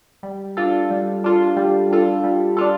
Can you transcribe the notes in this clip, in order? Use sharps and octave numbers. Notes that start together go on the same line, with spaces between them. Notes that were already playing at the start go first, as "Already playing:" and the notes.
G3
D4 F4 A4
G3
D4 F4 A4
G3
D4 F4 A4
G3
D4 F4 A4